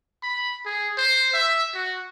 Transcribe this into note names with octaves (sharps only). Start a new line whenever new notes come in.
B5
G#4
C5
E5
F#4